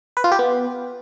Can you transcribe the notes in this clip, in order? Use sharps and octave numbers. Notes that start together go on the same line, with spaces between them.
B4
F4
G4
B3